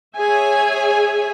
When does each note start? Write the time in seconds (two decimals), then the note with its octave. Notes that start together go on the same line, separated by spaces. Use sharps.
0.16 G#4 C#5 E5 G#5